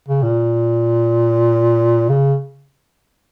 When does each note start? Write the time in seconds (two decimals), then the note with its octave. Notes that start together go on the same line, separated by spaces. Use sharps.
0.08 C#3
0.23 A#2
2.09 C#3